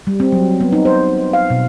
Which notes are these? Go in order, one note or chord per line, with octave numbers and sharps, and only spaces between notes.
G3
C4
F#3
B3
D#4
C5
F5
B2